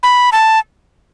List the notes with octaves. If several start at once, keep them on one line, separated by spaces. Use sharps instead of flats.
B5
A5